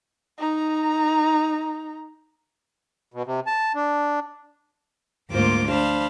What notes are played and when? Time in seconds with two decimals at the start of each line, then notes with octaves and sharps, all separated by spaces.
0.39 D#4 A#5
3.14 B2
3.26 C3
3.47 A5
3.75 D4
5.30 D2 G#2 A#3 F4 C5 D6
5.68 D4 C5 F5 A5 B5